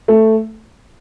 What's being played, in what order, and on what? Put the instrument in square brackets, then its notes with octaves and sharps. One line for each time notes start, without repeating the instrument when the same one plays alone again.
[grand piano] A3